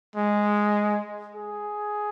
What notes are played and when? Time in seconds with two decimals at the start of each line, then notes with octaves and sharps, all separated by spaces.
0.16 G#3
1.35 G#4